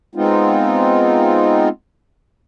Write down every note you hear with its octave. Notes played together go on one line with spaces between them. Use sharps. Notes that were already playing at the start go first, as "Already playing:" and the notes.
G#3 B3 C4 D#4 F4